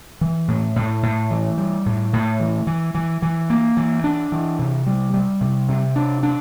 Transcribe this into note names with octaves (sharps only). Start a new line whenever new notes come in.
E3
A2
A2
A2
E3
G3
A2
A2
E3
E3
E3
E3
A#3
E3
D4
E3
C3
G3
G3
C3
C3
D4
D4